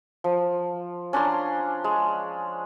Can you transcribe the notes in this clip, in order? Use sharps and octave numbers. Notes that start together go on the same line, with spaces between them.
F3
C#4 D4 A#5 C6
G#3